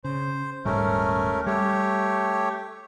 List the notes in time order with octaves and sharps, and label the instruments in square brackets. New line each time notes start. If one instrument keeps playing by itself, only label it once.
[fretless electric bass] C#3 [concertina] C5
[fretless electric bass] D#1 G#2 G3 [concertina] A3 C#4 A#4
[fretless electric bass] G3 [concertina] A3 G4 C#5